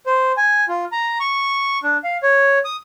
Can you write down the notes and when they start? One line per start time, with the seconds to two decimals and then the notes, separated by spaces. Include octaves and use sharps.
0.06 C5
0.37 G#5
0.68 F4
0.92 A#5
1.20 C#6
1.83 D4
2.04 F5
2.23 C#5
2.65 D#6